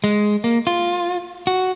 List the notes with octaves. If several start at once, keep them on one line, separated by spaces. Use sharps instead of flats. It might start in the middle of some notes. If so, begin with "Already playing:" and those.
G#3
A#3
F4
F#4